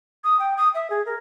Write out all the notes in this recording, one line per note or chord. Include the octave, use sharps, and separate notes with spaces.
D#6
G5
D#6
E5
G#4
A#4